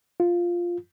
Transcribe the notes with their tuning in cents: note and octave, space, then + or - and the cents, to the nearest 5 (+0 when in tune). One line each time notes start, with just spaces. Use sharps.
F4 +0